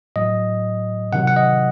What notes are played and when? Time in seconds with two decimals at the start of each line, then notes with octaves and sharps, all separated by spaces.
0.16 A2 F#3 D#5
1.12 C3 D#3 F#3 F#5
1.27 F#5
1.36 D#5